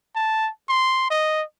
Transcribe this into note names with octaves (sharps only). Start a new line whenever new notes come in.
A5
C6
D#5